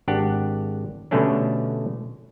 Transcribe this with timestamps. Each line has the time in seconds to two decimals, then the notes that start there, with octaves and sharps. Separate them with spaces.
0.08 G#1 D4 G4 F#5
1.11 B2 D3 G3 A3 C#4 D4